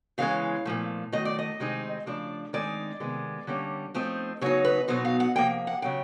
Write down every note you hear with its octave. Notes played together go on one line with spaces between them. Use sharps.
C#3 E3 G#3 C#4 F5
A#2 F3 A3
D#3 F#3 A3 D#5
D5
D#5
C3 D#3 G#3 C4 D#4
C#3 F3 A3 D4 D5
D#3 G#3 C4 D#4 D5
C3 D#3 G#3 B3
D3 G3 A#3 C#4
F3 A3 C4 D#4
C#3 F#3 B3 D#4 C#5
B4
B2 F#3 B3 D#4 C5
F5
F#5
C3 F3 A#3 G5
F#5
C#3 F#3 B3 G5